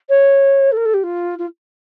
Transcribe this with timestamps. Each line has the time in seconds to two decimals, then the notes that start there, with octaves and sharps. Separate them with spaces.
0.09 C#5
0.72 A4
0.77 A#4
0.85 A4
0.94 G4
1.03 F4
1.39 F4